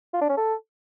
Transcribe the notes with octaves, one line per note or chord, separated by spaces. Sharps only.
F4
D4
C#4
A4